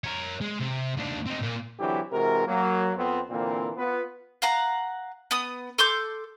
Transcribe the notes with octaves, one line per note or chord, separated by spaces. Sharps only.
A#4 C#5
G#3
C3
D#2 D4
C4 D#4
A#2 A#3
D3 E3 F#3 C4 E4 G4
C3 E3 G#3 F#4 A#4
F#3 A#3
F2 B3 C4
A#2 D3 E3 A#3 C4
B3 F4 B4
F5 F#5 A#5
B3 D#6
A4 C6 D6 G6